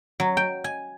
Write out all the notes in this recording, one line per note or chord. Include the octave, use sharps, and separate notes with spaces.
F#3
G5
G#5